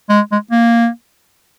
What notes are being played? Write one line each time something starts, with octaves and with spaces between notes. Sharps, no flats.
G#3
G#3
A#3